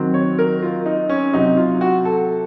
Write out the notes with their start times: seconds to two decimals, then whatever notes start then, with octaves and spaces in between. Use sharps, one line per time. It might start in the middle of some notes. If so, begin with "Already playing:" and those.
Already playing: D#3 F#3 C4
0.14 C#5
0.39 A#4
0.62 F4
0.86 D#4
1.09 C#4
1.33 C3 F#3 C4 D#4
1.57 F4
1.81 F#4
2.05 A4